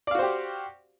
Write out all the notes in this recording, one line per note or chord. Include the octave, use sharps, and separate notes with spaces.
F#4 G4 C5 D5 F5